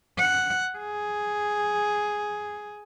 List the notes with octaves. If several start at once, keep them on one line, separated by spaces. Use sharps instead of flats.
F#5
G#4